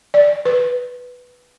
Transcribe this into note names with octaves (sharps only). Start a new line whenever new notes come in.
D5
B4